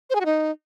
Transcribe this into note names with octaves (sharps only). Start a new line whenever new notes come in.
C5
G#4
F#4
D#4